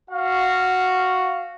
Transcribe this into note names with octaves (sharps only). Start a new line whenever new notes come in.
F#4 F5